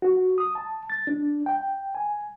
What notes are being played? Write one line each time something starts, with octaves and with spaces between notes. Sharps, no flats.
F#4
D#6
A5
A6
D4
G5
G#5